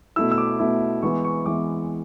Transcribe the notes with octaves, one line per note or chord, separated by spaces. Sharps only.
B2 A3 E4 E6
E6
D6
B2 A3 E4
E3 G#3 B3 E4 C#6
C#6
E3 G#3 B3 E4 D6